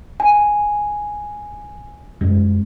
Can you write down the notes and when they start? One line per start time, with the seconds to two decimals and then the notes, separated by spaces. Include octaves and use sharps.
0.20 G#5
2.21 F#2 G#3